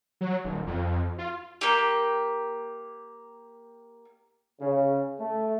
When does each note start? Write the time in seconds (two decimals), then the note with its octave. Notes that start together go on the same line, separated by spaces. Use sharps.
0.21 F#3
0.45 D#1
0.67 F2
1.18 F4
1.61 A#3 G4
4.60 C#3
5.19 A3